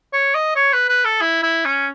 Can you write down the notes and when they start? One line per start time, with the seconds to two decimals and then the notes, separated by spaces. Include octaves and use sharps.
0.13 C#5
0.35 D#5
0.56 C#5
0.73 B4
0.89 B4
1.05 A4
1.21 E4
1.43 E4
1.65 C#4